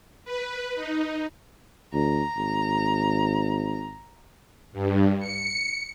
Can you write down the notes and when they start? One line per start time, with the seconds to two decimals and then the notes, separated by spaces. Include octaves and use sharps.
0.25 B4
0.75 D#4
1.94 D2 A#5
2.37 G#1
4.72 G2
5.19 C#7